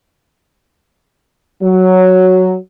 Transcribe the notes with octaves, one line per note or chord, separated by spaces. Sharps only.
F#3